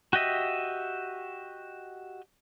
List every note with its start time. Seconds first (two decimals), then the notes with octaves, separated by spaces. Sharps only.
0.13 F#4 G4 D#5 E5